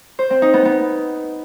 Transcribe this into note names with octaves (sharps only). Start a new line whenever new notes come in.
C5
C4
D#4
B3
B3